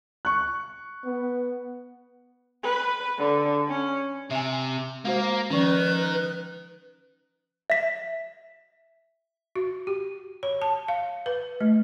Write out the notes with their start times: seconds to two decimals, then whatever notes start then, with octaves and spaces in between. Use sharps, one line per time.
0.25 C#6 F#6
1.05 B3
2.64 B4
3.18 D3
3.67 C#4
4.31 C3 E5 G#5
5.05 G#3 A#3 F#4 C5
5.50 D#3 F3 C#4 B4
7.70 E5 B6
9.56 F#4
9.87 G4
10.43 C#5
10.62 A5
10.88 F5
11.26 B4
11.61 A3